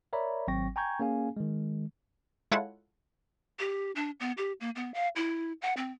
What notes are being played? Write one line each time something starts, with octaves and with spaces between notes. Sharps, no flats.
A#4 C#5 D5 E5 A#5 B5
G#1 F#3 C4 G5 C#6 A#6
G5 G#5 A#5 C#6 G6 G#6
A#3 C#4 G#4 F5 G#5
D#3 G#3
G#3 E4 F4 A4 C#5 F#5
G4
D4
B3
G4
A#3
B3
F5
E4
F#5
C4